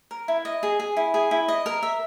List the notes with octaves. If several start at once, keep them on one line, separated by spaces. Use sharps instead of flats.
A#4
E4
D#5
G#4
G#4
E4
G#4
E4
D#5
A#4
E5